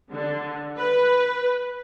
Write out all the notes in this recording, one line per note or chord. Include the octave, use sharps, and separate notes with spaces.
D3
B4